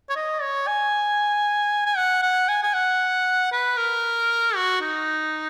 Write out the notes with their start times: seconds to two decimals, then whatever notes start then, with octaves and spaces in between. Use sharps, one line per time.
0.10 C#5
0.16 D#5
0.42 C#5
0.67 G#5
1.86 G#5
1.97 F#5
2.22 F#5
2.49 G#5
2.63 G#5
2.74 F#5
3.52 B4
3.77 A#4
4.55 F#4
4.81 D#4